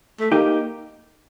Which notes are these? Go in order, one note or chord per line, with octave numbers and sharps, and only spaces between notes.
A3
A#3 D#4 G4